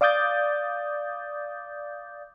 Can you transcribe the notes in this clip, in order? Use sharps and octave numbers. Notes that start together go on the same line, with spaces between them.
D5 F5 D6 D#6 G6 A6